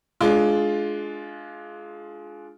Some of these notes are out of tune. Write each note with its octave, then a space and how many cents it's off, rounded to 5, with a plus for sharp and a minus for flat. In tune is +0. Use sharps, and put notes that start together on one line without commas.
G#3 +25 D4 +0 F4 +0